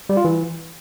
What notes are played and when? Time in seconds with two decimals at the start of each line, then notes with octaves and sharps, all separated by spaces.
0.09 G3
0.17 F4
0.25 E3